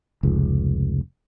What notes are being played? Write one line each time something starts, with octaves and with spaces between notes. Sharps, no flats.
F1 C#2